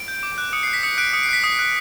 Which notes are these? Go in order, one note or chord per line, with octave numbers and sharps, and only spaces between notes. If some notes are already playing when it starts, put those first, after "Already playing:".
Already playing: D7
G6
D6
F#6
D#6 C#7
F#6 C7
B6
D#6 C#7
F#6 D7
D#6 C#7
C7
F#6 B6
D#6 C7
F#6